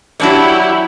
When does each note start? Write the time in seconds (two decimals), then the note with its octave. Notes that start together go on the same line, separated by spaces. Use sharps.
0.20 F#3 D4 E4 G4 C#5